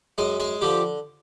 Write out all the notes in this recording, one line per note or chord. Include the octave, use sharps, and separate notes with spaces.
F#2 G#3 G#4
G#3 G#4
D3 F3 G3 G4